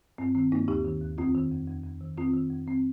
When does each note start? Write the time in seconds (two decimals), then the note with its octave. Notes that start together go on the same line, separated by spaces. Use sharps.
0.18 G2 C4
0.35 D#3 C4
0.52 G2 A#3 D#4
0.68 D#2 D#4 G4
0.85 D#3
1.02 D#2
1.18 F2 C4 F4
1.34 D#3
1.51 F2
1.68 F2
1.84 F2
2.01 D#3
2.17 F2 C4 F4
2.33 D#3
2.51 F2
2.67 F2 C4